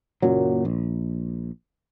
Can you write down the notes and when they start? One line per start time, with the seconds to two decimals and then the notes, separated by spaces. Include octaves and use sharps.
0.22 F#1 F#2 A#2 F#3
0.65 A#1